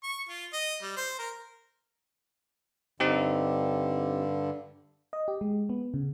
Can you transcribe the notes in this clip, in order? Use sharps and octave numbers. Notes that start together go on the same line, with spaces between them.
C#6
F4
D#5
G3
C5
A#4
G2 D3 C4 D#4 G4
D#5
G4
G#3
B3
C#3